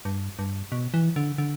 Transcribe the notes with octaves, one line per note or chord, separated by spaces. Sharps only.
G2
G2
B2
E3
D3
D3